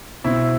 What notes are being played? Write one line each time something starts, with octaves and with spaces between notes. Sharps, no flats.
B2 C4 E4